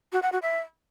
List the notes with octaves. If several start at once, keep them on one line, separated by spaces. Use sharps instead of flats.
F#4
F#5
F#4
E5